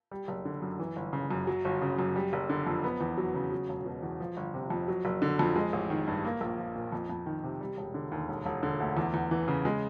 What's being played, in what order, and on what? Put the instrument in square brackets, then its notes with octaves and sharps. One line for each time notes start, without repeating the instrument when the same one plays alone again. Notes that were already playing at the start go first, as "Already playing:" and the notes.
[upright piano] G3
F#1
D3
F#2
E3
G1
C#3
F#2
F#3
G1
C#3
F#2
G3
F#1
D3
F2
B3
E2
F#3
C#3
F#3
E1
B2
E2
F3
G1
C3
F2
F#3
F#1
D3
F2
G#3
A1
D#3
G2
A#3
A#1
F3
A#2
F2
F2
D#3
C3
G3
E1
D3
D#2
E1
E1
D3
D2
E2
E2
E3
C#3
G#3